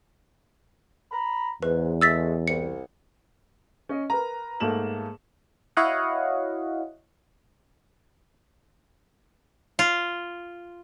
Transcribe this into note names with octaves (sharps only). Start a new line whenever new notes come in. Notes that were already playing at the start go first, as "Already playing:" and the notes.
A#5 B5
E2 G#2 B4
D3 G#3 A3 E6 A6 B6
C2 C#7
C#4 D#5
A#4 B4 A#5
G#2 A3 A#3 A5 E7 F#7
E4 F#4 C#5 D#5 F5 F#5
F4